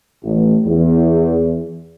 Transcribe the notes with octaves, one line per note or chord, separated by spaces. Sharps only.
A1
E2